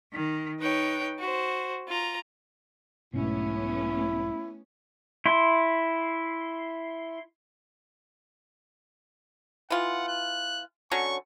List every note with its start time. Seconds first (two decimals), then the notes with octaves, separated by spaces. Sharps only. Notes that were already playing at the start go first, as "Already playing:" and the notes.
0.13 D#3
0.59 D#4 B4 C#5 G5
1.19 F#4 C5
1.88 F4 A#5
3.14 B1 G#2 B2 A3 B3 C#4 E4
5.26 E4 C6
9.70 E3 F4 F#5
10.08 F#6
10.92 D3 F#3 C#4 C#6